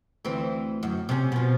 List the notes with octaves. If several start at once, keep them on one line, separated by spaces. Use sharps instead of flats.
D2 E3 C4
F#2
C3 C#4
B2 F3